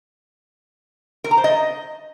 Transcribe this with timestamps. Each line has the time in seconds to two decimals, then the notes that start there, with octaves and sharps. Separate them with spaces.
1.24 A#4
1.31 A#5
1.38 C5
1.44 D#5